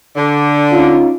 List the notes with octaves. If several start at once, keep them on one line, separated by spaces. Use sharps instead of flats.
D3
C#4 D#4 F4